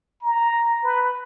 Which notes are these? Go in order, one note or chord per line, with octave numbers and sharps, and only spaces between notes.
A#5
B4